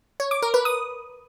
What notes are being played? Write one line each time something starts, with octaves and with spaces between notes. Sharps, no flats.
C#5
D6
A#4
B4
D#6